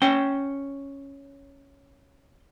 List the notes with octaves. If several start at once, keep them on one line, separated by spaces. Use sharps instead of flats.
C#4 G5